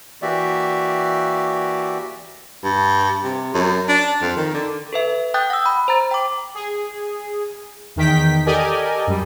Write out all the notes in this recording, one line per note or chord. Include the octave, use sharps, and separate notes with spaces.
E3 A#3 F#4 G4 D5 E5
G2
C3
F#2
D4
F2
D#3
D3
A4 B4 E5
G5 D#6 F#6 G6 A6
F#5 E6
B5
C5 A#5 A6
G5 D6
G#4
E2 D#3 G5 B6
G4 A4 A#4 D5 D#5 G#5
F#2 G3